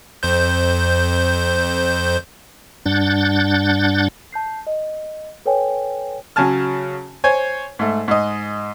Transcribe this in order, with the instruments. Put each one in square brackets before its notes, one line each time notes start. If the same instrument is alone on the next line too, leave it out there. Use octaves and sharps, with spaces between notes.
[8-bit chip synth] F2 C5 G6
[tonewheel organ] G2 D4 F#5 G6 A6
[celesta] A5 G6 C7
D#5
A4 B4 C#5 G5 G#5
[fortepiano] C#3 F#3 G#5 A5 F6
C5 C#5 G#5
G#2 A3
G#2 D#5